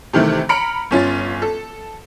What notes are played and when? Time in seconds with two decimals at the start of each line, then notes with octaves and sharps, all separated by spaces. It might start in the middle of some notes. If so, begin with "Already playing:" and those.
0.13 C3 D#3 E3 A3
0.49 A#5 B5 F6 C#7 D7
0.91 G1 C#4 F4 A6
1.42 A4